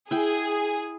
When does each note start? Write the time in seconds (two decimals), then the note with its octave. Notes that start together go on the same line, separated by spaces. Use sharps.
0.11 E4 G#4 G5